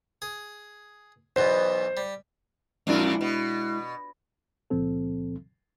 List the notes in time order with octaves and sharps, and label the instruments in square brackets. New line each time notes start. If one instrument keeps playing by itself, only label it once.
[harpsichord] G#4
[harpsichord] B1 E2 B2 [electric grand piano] C5
[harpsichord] G3
[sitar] F2 A#2 D4 [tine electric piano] G#3 E4
[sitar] B2
[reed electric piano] C#2 A#2 F3 C4 A4